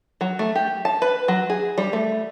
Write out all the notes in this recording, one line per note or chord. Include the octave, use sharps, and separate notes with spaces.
F#3
A3
G4
A5
B4
F#3
G#4
G3
A3